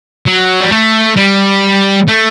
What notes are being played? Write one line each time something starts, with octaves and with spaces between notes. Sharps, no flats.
F#3
G3
A3
G3
A3